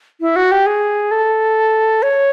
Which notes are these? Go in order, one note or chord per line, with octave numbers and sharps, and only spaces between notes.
E4
F#4
G4
G#4
A4
C#5